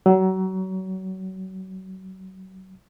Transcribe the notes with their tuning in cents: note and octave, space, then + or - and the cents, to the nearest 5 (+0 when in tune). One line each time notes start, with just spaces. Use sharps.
F#3 +30